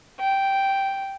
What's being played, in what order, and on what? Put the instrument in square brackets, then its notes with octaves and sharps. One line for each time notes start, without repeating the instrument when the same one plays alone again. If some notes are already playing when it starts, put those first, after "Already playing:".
[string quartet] G5